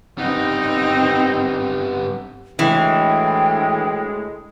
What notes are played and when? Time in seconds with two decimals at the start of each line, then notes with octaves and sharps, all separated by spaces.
0.18 G2 B3 C4 D#4
2.59 D2 A2 E3 G#3 G5